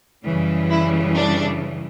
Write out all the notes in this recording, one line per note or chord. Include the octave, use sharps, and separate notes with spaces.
F#2 C#3 E3 G3
E4
D4